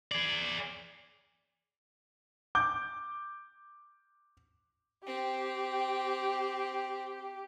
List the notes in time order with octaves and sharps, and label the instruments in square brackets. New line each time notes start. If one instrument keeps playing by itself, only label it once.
[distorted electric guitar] G#4 D5
[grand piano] D6 G6
[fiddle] C4 [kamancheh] G4 G5